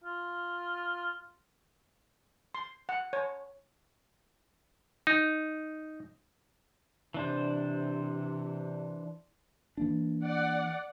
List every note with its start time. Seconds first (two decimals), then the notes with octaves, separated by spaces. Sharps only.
0.04 F4
2.55 C6
2.89 F#5
3.13 C#5
5.07 D#4
7.14 C3 E3 D4 C5
9.77 E3 A#3 D4
10.24 D5 F#5